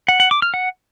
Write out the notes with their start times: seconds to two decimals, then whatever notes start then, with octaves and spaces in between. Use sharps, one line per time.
0.08 F#5
0.20 F#5
0.31 D6
0.42 F6
0.54 F#5